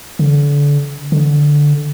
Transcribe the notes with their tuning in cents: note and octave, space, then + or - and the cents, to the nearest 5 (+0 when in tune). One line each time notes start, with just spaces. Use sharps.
D3 -30
D3 -5